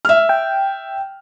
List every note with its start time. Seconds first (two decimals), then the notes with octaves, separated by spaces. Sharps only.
0.05 E5 F6
0.29 G5